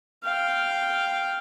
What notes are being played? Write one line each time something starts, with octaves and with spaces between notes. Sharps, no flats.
F5 G5